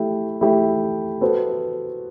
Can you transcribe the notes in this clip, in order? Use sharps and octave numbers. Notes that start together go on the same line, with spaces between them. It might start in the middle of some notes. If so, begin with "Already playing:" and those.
Already playing: A3 E4 G4
A3 E4 G4
B3 F#4 A4 C5